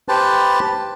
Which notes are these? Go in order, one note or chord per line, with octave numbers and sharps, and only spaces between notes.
G4 B4 C5 A5